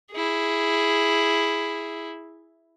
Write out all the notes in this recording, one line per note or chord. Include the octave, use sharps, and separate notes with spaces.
E4 G#4